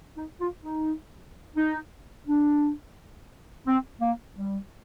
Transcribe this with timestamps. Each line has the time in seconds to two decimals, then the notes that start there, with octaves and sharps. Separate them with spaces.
0.17 D#4
0.40 F4
0.63 D#4
1.56 D#4
2.27 D4
3.66 C4
4.01 A#3
4.36 G3